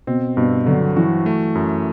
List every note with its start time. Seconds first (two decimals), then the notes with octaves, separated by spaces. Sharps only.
0.07 B2 C4
0.37 G2 B2
0.66 D3 F#3
0.96 E3 F#4
1.26 A3
1.55 F#2